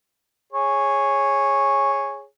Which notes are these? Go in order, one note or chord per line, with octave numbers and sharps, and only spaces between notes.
G#4 C#5